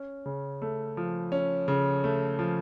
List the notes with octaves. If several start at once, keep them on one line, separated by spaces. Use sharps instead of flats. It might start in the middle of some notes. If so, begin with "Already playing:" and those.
Already playing: C#4
C#3
A3
F3
C#4
C#3
A3
F3